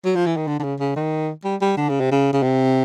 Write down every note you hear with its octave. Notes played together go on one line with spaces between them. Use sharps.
F#3
F3
E3
D#3
D3
D3
C#3
C#3
D#3
G3
G3
D3
C#3
C3
C#3
C#3
C3